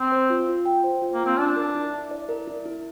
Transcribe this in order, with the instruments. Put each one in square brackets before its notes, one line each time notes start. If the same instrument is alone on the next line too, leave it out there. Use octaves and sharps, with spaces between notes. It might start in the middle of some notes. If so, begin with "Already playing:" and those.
Already playing: [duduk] C4
[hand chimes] C5
F4
F4
G5
C5
F4
[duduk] A#3
[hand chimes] F4
[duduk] C4
[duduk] D4 [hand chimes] D5
[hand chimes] A#4
E4
E4
D5
A#4
E4
E4